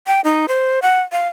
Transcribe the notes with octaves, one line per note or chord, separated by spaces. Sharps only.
G5
D#4
C5
F#5
F5